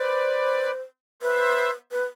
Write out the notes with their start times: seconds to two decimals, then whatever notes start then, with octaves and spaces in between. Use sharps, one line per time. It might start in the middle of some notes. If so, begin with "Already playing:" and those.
Already playing: B4 C5 D5
1.22 B4 C5 E5
1.92 B4